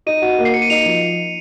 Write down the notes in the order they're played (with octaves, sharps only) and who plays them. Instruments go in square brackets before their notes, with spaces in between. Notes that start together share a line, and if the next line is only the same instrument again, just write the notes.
[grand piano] D#4 [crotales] D#7
[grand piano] F#4
A#3
[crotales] C7
[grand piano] A#3 [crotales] C#7
[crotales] D#7
[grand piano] D#4 [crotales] F7
[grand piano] F3